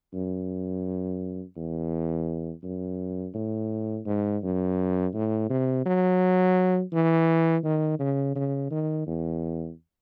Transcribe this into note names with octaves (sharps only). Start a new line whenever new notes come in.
F#2
E2
F#2
A2
G#2
F#2
A2
C3
F#3
E3
D#3
C#3
C#3
D#3
E2